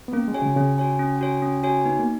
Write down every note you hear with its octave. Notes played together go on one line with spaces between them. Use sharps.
B3
A#3 C#4
G#3
F#4 C#5 G#5
C#3
C#3 C#4
F#4 C#5 G#5
C#4
F#4 C#5 G#5
C#4
F#4 C#5 G#5
B3 D#4
A#3